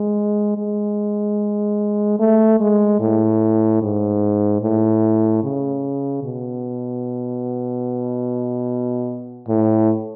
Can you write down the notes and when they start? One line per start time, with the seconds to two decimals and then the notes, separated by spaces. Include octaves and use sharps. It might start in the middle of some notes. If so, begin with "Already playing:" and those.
Already playing: G#3
0.57 G#3
2.19 A3
2.60 G#3
3.00 A2
3.82 G#2
4.62 A2
5.43 C#3
6.24 B2
9.48 A2